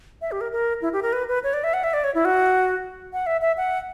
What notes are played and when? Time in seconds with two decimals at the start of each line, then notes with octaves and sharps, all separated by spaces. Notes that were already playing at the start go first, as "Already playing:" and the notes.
0.21 E5
0.32 G4
0.41 A#4
0.52 A#4
0.82 E4
0.93 G4
1.02 A#4
1.13 B4
1.28 B4
1.44 C#5
1.53 D5
1.64 E5
1.74 F#5
1.84 E5
1.94 D5
2.04 C#5
2.15 E4
2.25 F#4
3.13 F#5
3.26 E5
3.42 E5
3.57 F#5